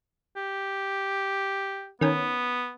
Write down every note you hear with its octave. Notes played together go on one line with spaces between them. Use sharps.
G4
D#3 B3 C#4